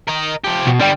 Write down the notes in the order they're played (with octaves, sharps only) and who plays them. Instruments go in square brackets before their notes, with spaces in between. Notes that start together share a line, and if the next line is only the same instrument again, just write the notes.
[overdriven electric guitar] A#4 D#5
F3 G4
[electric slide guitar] B2
[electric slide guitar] D3 D5 G5 [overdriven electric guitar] G3